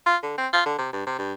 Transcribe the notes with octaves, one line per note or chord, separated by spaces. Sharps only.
F4
D3
C4
F4
D3
C3
G2
C3
G2